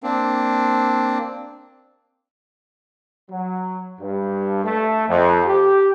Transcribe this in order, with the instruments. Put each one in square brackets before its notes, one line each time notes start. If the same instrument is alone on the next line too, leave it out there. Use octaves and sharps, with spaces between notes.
[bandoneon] A#3 C4 D4
[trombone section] F#3
G2
A3
F2
G4